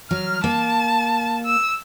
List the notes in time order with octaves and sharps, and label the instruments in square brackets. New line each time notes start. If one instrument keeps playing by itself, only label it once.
[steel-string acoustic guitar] F#3 [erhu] F6
[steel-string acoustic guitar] A#3 [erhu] A5
[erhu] E6